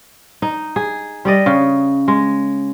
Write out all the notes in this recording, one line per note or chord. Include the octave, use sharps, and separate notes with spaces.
D#4
G#4
G3 D5 D#5
C#3
G#3